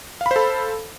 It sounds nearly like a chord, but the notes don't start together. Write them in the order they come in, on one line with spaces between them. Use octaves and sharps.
F5 B5 C5 A4